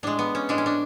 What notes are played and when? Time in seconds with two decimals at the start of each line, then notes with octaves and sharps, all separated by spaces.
0.03 A2 G#3 D4
0.19 B3
0.35 C#4
0.49 A2 G#3 D4
0.58 C#4
0.66 D4